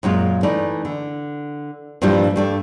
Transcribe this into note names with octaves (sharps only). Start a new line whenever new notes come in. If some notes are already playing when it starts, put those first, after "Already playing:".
F#2 A#2 G#3 F4
E3 A3 D#4 D5
D3
G2 A#2 E3 F3 G3
G2 A3 D5